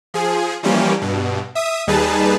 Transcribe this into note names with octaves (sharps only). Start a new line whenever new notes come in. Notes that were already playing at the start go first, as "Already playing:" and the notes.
F3 G#4
E3 F3 G3 A#3 C#4 G4
G2 B2
E5 D#6
D#2 G3 D#4 G#4 B4 A5